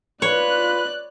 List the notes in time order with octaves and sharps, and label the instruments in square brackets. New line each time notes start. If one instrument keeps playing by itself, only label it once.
[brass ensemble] F4 B4 [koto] C#5 [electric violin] D5 F#6